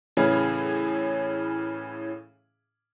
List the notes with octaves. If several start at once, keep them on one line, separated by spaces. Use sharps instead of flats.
A2 C#3 E3 C#4 G#4